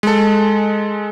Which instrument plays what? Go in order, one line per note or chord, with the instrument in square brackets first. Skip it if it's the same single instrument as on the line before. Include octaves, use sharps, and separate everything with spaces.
[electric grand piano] G#3 A4